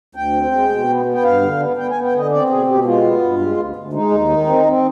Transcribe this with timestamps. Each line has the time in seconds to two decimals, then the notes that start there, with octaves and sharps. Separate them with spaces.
0.15 D2 G5
0.33 C4
0.51 G#3
0.69 B2
0.88 B3
1.05 B3
1.14 G5
1.23 G2 F5
1.41 D3
1.60 B3
1.77 B3 G5
1.90 B3 G#5
2.04 G5
2.13 D3 D#5
2.31 C4 D5
2.49 B2 G#4
2.67 B2 G4
2.85 G#3 F4
3.04 B3
3.21 G2
3.39 G#3
3.57 D2
3.76 D2
3.93 G#3 D#4
4.11 D#2
4.29 D#3
4.47 C4
4.65 C4